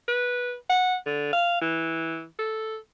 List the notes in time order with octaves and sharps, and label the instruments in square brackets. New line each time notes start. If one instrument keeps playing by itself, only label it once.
[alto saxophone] B4
F#5
D3
F5
E3
A4